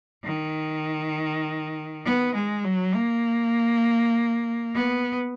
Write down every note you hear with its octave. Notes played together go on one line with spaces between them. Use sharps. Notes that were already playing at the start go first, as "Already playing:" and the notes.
D#3
B3
G#3
F#3
A#3
B3